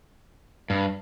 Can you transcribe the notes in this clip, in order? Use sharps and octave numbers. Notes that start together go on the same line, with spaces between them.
G2